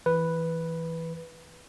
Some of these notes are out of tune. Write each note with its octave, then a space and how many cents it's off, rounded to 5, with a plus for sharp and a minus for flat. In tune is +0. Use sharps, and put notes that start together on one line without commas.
E3 -5 B4 +0